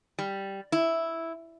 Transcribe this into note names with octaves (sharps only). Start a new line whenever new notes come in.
G3
E4